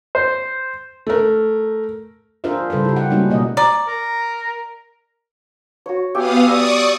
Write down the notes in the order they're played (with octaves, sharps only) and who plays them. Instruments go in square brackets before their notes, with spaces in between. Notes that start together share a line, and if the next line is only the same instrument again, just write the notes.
[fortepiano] C5
[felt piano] A3 A#4
[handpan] D4 F4 G#4 A#4 C5 E5
C#3 G3 A4 B4 C5
E4 G4
G4 F#5
G3 G#3 A#3 C#4 D#4 F#4
B2 A#3 A#4 D#5
[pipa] D5 [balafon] A#5
[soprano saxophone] A#4
[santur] F#4 C#5
[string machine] B3 F5 D#6 [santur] G4 E5 G#5
[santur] G3 D#5 E6 [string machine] D5 C#6 D#6